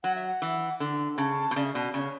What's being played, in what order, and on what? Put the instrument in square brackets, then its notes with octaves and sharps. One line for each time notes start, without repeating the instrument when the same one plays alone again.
[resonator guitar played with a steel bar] F#3 [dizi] F#5
[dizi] E5
F#5
[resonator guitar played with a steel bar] E3
D3
[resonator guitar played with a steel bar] C#3 [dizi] A5
[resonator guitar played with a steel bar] B2
[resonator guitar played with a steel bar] C#3 [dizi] D5
[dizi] E5
[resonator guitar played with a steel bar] B2 [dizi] D5
[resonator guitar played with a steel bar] C#3 [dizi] D5
[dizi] C#5